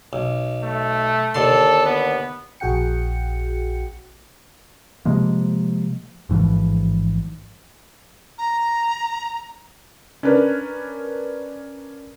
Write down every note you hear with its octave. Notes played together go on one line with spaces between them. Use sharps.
B1
A3
D#2 D3 A4 C6
B3
A#1 F#4 G#4 F#5 G5 C#7
C3 F3 G#3 A#3
A1 G#2 E3 F3
A#5
C#4 D4 A#4 B4